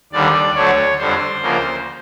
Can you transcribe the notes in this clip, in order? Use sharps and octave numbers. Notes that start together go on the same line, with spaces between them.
D#2 D3 G3 D5
D2 D3 F#3 A3 C#5
F2 D3 G3 C4 C5
D2 C#3 F3 A#3